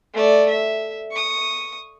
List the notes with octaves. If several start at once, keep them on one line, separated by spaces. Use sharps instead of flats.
A3 D5
E5
C#6 D#6